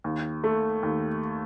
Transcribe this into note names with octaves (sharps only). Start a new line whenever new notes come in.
D#2
A3
D#2